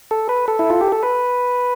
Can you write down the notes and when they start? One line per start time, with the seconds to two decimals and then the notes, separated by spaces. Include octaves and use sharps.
0.11 A4
0.29 B4
0.48 A4
0.59 E4
0.70 F4
0.81 G4
0.92 A4
1.03 B4